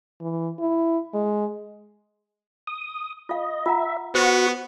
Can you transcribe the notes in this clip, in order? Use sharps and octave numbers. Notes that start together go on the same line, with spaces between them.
E3
E4
G#3
D#6
F4 D#5 F5
F4 E5 F#5 A#5
B3 F#4 C5 F#5 C#6